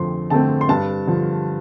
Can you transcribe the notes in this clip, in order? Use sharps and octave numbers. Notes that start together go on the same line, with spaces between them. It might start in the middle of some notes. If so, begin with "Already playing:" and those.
Already playing: F2 D3 A3 C4 C6
D3 A3 C4 A5
C6
G2 A5
D3 F3